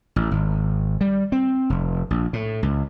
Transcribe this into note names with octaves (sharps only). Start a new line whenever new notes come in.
A1
G#1
G3
C4
F1
A#1
A2
C#2